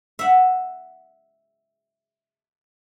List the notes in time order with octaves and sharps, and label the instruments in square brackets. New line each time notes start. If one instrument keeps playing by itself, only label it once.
[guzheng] E5 F#5